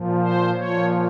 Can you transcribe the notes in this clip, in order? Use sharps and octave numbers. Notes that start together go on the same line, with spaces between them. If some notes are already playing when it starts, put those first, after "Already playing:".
Already playing: A#2 F3
C5
A#2 F3 C#5